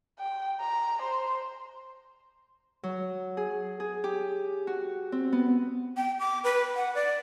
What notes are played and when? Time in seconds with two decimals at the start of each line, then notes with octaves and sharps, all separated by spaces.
0.19 G5
0.60 A#5
1.02 C5
2.83 F#3
3.37 G#4
3.80 G#4
4.04 G4
4.67 F#4
5.12 C4
5.32 B3
5.97 G5
6.20 D6
6.44 B4
6.76 F#5
6.95 D5